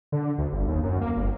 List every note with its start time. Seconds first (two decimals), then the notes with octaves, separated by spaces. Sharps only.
0.12 D3
0.38 D2
0.52 G1
0.68 D#2
0.83 F#2
1.01 A#3
1.17 G1